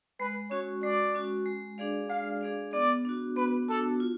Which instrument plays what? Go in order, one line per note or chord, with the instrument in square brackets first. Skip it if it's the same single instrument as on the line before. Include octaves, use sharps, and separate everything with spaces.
[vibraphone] G#3 [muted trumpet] B4
[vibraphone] C#4 F#4 [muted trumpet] C#5
[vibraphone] G#3 [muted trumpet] D5
[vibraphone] C#4 F#4
G#3
D4 G#4 D5 F5
[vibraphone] G#3 [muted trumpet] F5
[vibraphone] D4 G#4 D5 F5
[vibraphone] B3 [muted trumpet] D5
[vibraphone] D4 F#4
[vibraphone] B3 [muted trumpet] B4
[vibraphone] D4 F#4 [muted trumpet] A4
[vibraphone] F4